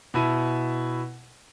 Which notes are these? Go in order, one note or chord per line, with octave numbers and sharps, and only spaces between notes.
B2 E4 D#7